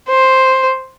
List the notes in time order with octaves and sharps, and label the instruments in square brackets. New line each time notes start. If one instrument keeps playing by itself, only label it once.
[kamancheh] C5